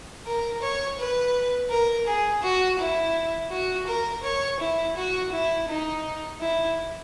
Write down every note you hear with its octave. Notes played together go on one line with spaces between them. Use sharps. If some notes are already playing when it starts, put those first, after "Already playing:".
A#4
C#5
B4
A#4
G#4
F#4
E4
F#4
A#4
C#5
E4
F#4
E4
D#4
E4